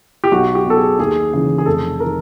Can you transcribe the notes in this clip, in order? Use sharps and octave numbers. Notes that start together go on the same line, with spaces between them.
G4
B1 F#4
G4
B2
A4
G#4
D#2 G#4
C#3 E3
G#4
F1 A4
D#3 A#4